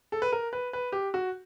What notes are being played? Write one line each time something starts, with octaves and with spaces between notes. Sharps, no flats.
A4
B4
A#4
B4
B4
G4
F#4